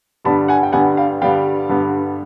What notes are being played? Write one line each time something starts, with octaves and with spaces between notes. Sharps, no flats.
G2 D3 G3 B3 A5 B5
F#5 G#5
G5
G2 D3 G3 B3 F#5 G#5
F5 G5
G2 D3 G3 B3 F5 G5
G2 D3 G3 B3